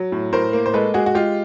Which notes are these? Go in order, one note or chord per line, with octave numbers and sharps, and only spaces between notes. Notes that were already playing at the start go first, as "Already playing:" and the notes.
Already playing: F#3
A2
A2 A#4 C5
A#3
C5
G#3 A4 B4
G#3 F#4 G#4
F#4
G#3 F4 G4